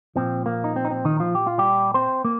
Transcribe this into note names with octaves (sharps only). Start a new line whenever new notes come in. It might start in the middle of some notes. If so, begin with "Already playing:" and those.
A#2 F3 C4
A#3
D#4
C4
D#4
C4
D#3 D#4
F3 F4
G4
F4
G3 G4
C4 C5
A#3